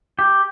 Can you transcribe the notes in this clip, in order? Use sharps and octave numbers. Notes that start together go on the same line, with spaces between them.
G4